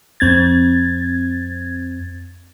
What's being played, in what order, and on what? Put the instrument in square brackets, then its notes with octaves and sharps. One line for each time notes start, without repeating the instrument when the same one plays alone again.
[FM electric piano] F2 C4 G#6 A6